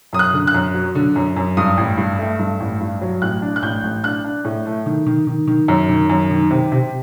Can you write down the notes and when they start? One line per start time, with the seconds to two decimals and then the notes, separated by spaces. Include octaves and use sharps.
0.13 F#2 D#6
0.19 F#6
0.33 D3
0.47 F#6
0.54 F#2
0.74 F#3
0.95 D3
1.16 F#2
1.36 F#2
1.57 G2 D#6
1.77 A1
1.97 G2
2.19 A3
2.39 G2
2.60 A1
2.80 G2
3.01 F#3
3.22 A1 F#6
3.42 D4
3.56 F#6
3.63 A1 G6
3.84 A1
4.04 D4 F#6
4.25 D4
4.45 A2
4.66 A3
4.86 D#3
5.07 D#3
5.27 D#3
5.47 D#3
5.68 F#2
5.89 D#3
6.10 F#2
6.31 D#3
6.51 C3
6.72 C3